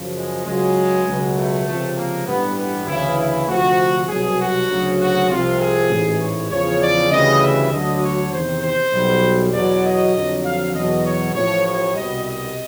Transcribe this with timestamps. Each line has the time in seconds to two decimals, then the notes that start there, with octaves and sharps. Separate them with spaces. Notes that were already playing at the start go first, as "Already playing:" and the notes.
Already playing: F#2 C#3 F3
0.14 G#3
0.45 C#2 C#3 F#3 G#3
1.06 C#2 B2 F#3
1.36 A3
1.66 C#2 C3 F3
1.96 A#3
2.26 A1 G2 E3 G3 B3
2.57 B3
2.86 D2 C#3 E3 E4
3.17 E4
3.47 D2 C3 F3 F#4
4.08 C2 B2 F#3 G#4
4.39 F#4
4.68 D2 C#3 F#3
4.98 F#4
5.29 C2 C3 F3 F4
5.59 G#4
5.89 A1 G#2 E3
6.20 C#5
6.50 E2 C#3 F3 C#5
6.80 D5
7.10 D2 C#3 E3 G3 D#5
7.41 E5
7.71 D2 D3 F#3 D#5
8.01 C#5
8.31 E2 C3 D#3 C5
8.62 C5
8.92 B1 B2 G3
9.52 E2 B2 F#3 D5
9.83 D#5
10.13 F2 D3 F#3
10.44 F5
10.74 E2 B2 F#3 D#5
11.04 C#5
11.34 A1 A2 F3 C#5
11.64 C#5
11.94 C2 B2 G3 D#5
12.25 D#5